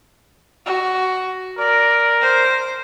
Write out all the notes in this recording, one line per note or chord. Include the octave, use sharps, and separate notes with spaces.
F#4
A#4 D5
C5